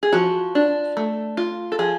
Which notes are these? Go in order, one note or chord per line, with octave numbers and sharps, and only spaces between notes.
G#4
F3 F#4
D4
A3
F4
A4
F3 G#4